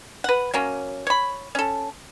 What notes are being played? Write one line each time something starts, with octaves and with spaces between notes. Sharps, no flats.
B4 F#5
F#3 A#3 C#4
C#5 B5
C#4 A4